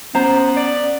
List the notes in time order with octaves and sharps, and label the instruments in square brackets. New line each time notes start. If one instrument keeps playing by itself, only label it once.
[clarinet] B3 [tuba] C#4 [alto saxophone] C5 [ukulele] A#5
[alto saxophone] D5